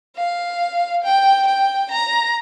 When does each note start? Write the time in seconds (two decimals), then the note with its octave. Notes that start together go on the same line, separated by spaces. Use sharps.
0.16 F5
1.04 G5
1.47 G5
1.91 A#5